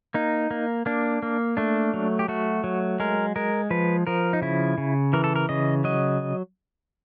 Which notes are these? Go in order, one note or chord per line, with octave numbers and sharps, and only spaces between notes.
A#3 D#4
A#3
A#3 D4
A#3
A3 D4
F#3
G4
A3 F#4
F#3
G#3 A#4
G#3 A#4
F3 B4
F3 A#4
D#4
C#3 E4
C#3
E3 A#4
A4
A#4
C#3 D#5
F#3 D#5